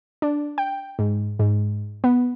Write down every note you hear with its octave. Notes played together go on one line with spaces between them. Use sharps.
D4
G5
G#2
G#2
B3